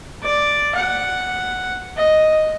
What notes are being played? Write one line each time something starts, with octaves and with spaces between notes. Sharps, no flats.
D5
F#5
D#5